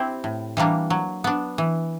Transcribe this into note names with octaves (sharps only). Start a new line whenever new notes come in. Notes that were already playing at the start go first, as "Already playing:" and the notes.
Already playing: C4 E4 G4
A2
E3 G3 A#3 D4
F#3
B3 D4
E3